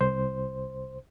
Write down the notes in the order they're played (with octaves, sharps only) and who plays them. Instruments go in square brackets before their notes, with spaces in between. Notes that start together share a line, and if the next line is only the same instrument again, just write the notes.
[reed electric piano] C2 C5